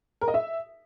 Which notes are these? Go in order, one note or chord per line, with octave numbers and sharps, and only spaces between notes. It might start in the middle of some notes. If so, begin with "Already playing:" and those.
A#4
D#5
E5